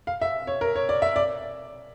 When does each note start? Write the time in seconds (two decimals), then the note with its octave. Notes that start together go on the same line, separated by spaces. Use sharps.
0.07 F5
0.22 E5
0.47 C#5
0.61 A#4
0.76 C#5
0.89 D5
1.02 E5
1.16 D5